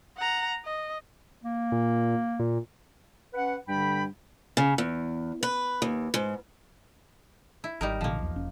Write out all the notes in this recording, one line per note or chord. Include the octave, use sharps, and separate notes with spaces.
F#5 A#5
D#5
A#3
A#2
A#2
C#4 B4 F#5
G2 D3 G5 B5
C#3
E2
B4
D#2
G#2
E4
G#1 G3 D#4 A#4
A1 B2 D3 F3 A#3
B1 E2
E1 C#4